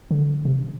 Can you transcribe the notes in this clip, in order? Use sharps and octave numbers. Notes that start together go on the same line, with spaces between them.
D3
C3